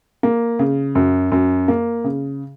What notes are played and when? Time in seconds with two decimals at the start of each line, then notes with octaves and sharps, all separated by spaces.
0.23 A#3
0.59 C#3
0.95 F#2
1.32 F#2
1.68 A#3
2.04 C#3